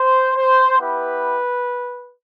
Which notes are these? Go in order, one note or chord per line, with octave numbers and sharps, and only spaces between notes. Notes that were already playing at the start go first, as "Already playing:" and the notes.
Already playing: C5
C5
B3 E4 G4 B4